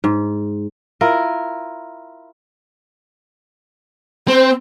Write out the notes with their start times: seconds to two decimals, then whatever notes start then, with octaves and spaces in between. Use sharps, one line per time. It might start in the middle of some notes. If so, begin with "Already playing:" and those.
0.04 G#2
1.01 E4 F4 A#4
4.28 C4 C5